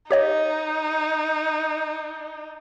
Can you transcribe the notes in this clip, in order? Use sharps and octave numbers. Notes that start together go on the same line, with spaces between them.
D#4 G4 C#5 D#5